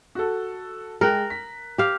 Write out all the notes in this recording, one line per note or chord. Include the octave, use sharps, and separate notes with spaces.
F#4 A4
G#3 A#4 G5 F#6
B6
G4 F5